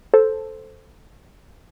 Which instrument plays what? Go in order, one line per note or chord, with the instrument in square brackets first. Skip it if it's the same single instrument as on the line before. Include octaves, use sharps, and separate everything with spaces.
[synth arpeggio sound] A4 C5